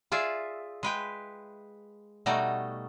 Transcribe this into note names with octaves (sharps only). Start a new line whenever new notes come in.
F4 G#4 D5 E5
G#3 B4 G5
B2 G3 A3 D#4 F#4 D5